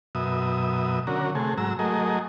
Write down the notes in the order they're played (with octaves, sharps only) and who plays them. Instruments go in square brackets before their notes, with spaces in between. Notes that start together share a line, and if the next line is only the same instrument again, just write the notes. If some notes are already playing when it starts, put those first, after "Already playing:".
[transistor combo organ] F#2 B2 E5 D#6
D3 C#4 F#4 A#4
C3 A3 G#4
G#2 F#3 A#5 E6
F#3 A3 G#4 A#4 D#5